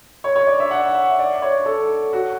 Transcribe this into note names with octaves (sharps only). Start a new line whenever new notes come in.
C#5
C#5
D5
E5
F#5
E5
D5
C#5
A4
F#4